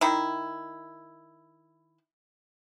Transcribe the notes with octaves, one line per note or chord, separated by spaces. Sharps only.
D#3 E4